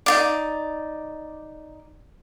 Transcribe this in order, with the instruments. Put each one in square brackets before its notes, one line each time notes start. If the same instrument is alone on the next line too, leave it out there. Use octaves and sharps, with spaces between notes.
[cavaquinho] D#4 F4 D5